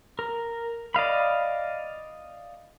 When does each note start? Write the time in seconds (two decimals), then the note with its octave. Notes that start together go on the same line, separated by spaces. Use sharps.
0.19 A#4
0.94 D5 D#5 F5 B5